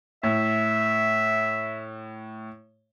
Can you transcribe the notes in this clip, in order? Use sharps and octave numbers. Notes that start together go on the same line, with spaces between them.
A2 E5